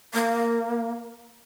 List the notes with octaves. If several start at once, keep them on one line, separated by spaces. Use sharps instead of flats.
A#3